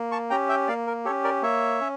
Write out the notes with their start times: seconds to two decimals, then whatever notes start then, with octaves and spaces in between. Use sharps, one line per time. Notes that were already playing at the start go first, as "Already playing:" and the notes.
Already playing: A#3
0.11 A5 C#6
0.30 C#4 G4 G5 A#5
0.49 E5 G5
0.68 A#3 D5 F5
0.87 A#4
1.05 G4 A4 C#5
1.10 C#4
1.24 A#4 D5
1.42 A#3 C#5 E5
1.81 C#4